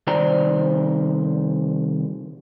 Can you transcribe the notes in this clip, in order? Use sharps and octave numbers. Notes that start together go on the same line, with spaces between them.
C2 D#3 C5 D5 G5 A#5